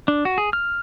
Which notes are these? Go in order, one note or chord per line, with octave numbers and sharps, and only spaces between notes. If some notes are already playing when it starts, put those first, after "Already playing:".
D4
F#4
G#4
F6